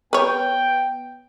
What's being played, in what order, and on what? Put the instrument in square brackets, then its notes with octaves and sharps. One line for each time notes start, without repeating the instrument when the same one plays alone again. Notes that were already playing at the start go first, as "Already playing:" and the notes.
[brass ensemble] B3 G5 [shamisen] B4 C#5